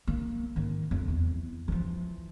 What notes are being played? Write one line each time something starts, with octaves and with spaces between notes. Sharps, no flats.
A#3
G#2 D#3
F2
E2
E3 F3